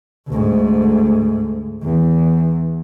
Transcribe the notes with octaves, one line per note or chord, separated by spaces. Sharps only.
D2 G#2
E2